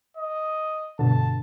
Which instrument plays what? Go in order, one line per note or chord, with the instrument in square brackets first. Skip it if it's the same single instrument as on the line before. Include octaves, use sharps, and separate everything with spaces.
[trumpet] D#5
[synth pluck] G2 B2 D3 [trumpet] A5